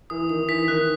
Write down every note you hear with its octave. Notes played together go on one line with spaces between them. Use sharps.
E3 D#6
D#3 D#6
E3 B6
D#3 F#6